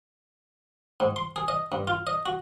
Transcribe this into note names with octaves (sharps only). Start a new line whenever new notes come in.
G#2
C6
G#4
D#5
G2
F4
D#5
F#4